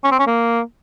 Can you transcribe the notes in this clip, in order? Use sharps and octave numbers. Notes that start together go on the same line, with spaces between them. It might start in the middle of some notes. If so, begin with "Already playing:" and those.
C#4
C4
C#4
A#3